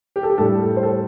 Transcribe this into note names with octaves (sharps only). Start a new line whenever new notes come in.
G4
A4
G4
A2 G3 A4
A4
C5
A4